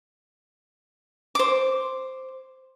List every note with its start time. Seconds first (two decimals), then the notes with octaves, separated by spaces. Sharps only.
1.35 C5 D6